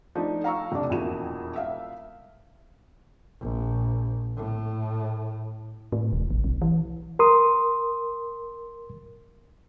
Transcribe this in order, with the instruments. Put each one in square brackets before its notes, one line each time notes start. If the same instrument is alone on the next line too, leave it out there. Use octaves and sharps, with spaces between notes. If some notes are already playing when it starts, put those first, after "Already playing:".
[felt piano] F3 A3 D4 D#4
F5 A#5 C#6 E6
F1 D4
E1 F2 A#2 E4 F#4 E7
E5 F5
[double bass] A#1
A2
[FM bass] A2
D#1
A1
B1
E3
[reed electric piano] A#4 C6 D#6